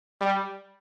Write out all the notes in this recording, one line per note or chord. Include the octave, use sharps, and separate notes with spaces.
G3